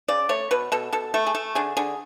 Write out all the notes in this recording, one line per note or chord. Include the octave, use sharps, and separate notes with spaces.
C#3 D5
A3 C#5
B2 B4
B2 A4
B2 A4
A3 A4
G#4
A3 A4
D3 G#4
D3 G#4